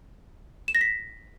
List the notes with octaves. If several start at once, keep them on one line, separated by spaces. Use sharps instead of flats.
E7
A#6
B6